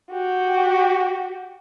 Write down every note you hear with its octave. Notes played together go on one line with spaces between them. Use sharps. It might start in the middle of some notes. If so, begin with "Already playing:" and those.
F#4 G4